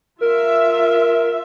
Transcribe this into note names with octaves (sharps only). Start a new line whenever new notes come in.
F4 A#4 E5